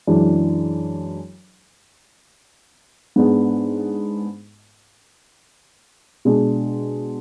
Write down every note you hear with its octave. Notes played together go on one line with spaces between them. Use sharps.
F#2 E3 G#3 D4
G#2 G#3 B3 D4
B2 G#3 D4